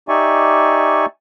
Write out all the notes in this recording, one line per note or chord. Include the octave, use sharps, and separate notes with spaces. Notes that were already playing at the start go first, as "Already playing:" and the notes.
D#4 G4 D5 E5 G#5 C#6